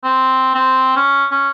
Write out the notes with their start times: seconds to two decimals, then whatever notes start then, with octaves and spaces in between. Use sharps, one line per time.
0.04 C4
0.54 C4
0.96 C#4
1.31 C#4